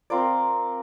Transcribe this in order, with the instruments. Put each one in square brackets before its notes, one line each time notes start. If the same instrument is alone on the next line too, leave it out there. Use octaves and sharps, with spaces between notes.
[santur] C4 F4 A#4 D5